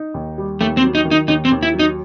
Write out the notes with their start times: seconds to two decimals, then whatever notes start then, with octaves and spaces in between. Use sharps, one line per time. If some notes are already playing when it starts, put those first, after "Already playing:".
Already playing: D#4
0.14 D#2
0.38 G3
0.60 D#2 A3
0.77 C4
0.82 F#3
0.95 D#4
1.05 D#3
1.11 D#4
1.28 D#2 D#4
1.45 C4
1.52 D#2
1.63 E4
1.74 F#3
1.79 D#4